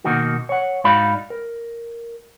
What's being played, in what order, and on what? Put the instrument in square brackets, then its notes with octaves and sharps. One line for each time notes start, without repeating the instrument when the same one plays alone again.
[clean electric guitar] B2 D#3 A#3 D#4 F#4
C#5 F#5
G#2 D#4 F#4 D5 F5 B5
A#4